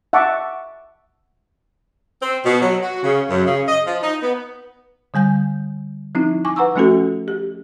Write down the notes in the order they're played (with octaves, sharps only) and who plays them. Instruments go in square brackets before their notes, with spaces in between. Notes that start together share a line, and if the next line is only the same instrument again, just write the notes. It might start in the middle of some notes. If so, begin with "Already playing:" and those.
[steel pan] E5 F#5 A5 C#6 D6
[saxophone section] C4
B2
F#3
F#4
C#3
F#2
C#3
D#5
F3
D#4
B3
[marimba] D3 G3 G#5 G6
F3 C4 D#4 E4
G#5 C#6 D6
B4 F#5 A#5 C#6 E6
F3 A3 C#4 F4 F#4 A4
G4